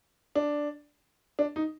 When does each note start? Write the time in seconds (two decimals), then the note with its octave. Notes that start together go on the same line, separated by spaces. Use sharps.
0.35 D4
1.39 D4
1.56 D#4